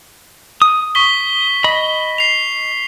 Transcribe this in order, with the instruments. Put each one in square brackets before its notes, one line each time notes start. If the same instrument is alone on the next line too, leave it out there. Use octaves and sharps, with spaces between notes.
[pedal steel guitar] D#6
[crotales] C#6 B6 G7
[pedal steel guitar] D#5 B5
[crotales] C7 F7